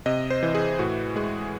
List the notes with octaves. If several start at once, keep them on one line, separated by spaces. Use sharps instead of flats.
C3 D#5
C5
E3
G#4
A2 F#4
G#3 G#4